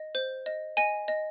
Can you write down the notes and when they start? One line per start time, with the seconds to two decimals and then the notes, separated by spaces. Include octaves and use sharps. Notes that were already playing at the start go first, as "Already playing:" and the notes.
Already playing: D#5
0.15 C5
0.46 D#5
0.77 D#5 G#5
1.08 D#5